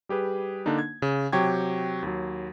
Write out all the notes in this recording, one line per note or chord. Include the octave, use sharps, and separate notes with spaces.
G3 G4 G#4 B4
D3 A#3 D4 D#4
G#6
C#3
C3 F#3 G4 G5 C#6 G#6
D#2 F#3